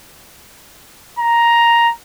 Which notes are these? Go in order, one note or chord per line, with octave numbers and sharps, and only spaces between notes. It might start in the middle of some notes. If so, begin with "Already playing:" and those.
A#5